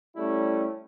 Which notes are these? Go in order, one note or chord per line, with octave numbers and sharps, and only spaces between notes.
G3 A3 C#4 E4